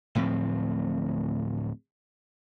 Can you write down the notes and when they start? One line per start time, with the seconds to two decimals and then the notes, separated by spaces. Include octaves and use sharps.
0.15 D1 A2 F3 C4